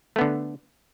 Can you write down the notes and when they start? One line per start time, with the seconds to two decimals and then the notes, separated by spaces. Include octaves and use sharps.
0.16 A3
0.18 B3
0.21 D3